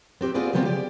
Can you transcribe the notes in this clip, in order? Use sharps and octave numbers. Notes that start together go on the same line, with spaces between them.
B3 C4 G4 B4
B3 C4 F4 G#4 B4 D5
C#3 F3 F#3 G#3 B3 C4
G4 D5